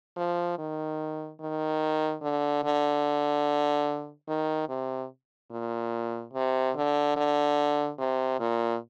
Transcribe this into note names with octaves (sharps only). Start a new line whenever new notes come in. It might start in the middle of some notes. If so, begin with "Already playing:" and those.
F3
D#3
D#3
D3
D3
D#3
C3
A#2
C3
D3
D3
C3
A#2